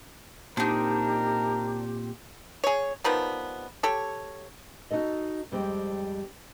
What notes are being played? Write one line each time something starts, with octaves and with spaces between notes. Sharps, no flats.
A#2 C4 D4 D#4 G4 A#4
G#4 C#5
D#3 F3 G3 B3
G4 A4 C#5
D#4 F#4 A4 D#5
F2 G3 G#3 C4